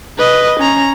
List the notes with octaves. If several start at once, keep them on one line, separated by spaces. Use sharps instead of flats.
B4 D#5
C#4 A#5